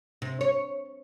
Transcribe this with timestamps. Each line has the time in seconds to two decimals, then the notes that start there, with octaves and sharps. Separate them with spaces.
0.22 C3
0.41 C#5